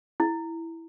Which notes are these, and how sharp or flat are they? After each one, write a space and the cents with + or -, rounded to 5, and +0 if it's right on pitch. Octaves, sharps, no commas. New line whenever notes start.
E4 +0